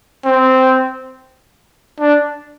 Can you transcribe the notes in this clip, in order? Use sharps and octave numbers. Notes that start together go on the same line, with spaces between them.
C4
D4